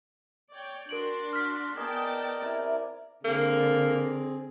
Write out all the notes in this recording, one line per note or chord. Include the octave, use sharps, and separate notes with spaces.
C#5 D5 G5
D4 F#4 A#4 C6 D7 F#7
F6 B6
B3 G#4 A#4 D5 D#5 G5 A5
C3 E4 G#5
D3 A#3 C4 G#4